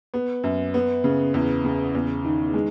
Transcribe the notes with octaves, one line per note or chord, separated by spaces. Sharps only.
B3
F#2
B3
C#3
E2
C#3
E2
D#3
G#3